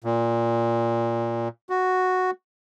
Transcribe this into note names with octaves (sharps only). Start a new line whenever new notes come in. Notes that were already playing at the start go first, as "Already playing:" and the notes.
A#2
F#4